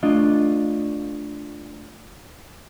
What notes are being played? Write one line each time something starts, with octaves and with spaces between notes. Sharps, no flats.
A3 D4 F4 D#5